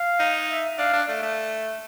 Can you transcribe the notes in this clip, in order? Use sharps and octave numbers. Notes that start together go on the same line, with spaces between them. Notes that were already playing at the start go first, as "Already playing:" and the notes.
Already playing: F5
D#4
E5
D4 F5
D4
A3
A3